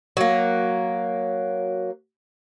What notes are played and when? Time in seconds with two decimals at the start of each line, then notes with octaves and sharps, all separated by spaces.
0.17 F#3 A#3